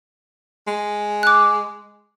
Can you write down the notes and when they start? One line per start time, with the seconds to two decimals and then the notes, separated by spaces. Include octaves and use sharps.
0.67 G#3
1.23 D6 F#6